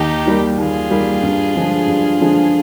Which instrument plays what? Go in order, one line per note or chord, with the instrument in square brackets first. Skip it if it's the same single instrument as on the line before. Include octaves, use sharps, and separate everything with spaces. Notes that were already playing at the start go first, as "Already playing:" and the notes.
Already playing: [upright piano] D#2 [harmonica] D#4 G4
[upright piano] D#3 G3 A#3
[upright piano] D#2 [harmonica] F4 G#4
[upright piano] D#3 G3 A#3
G2
D3 F3 G#3
G2
D3 F3 G#3